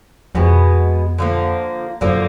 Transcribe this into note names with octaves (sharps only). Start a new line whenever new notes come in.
F2 B2 G#3 B3
D3 F3 A#3
F#2 D3 F3 A#3